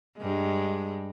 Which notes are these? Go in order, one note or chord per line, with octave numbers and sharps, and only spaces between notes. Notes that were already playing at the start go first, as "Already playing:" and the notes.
G2 G#3